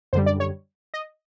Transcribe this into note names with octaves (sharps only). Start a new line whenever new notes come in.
F#2 D3 G3 C5
D5
C#5
D#5